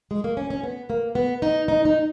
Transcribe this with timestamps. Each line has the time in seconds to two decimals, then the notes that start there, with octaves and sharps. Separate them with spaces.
0.11 G#3
0.24 A#3
0.37 C#4
0.50 C#4
0.63 B3
0.90 A#3
1.15 B3
1.42 D#4
1.68 D#4
1.85 D#4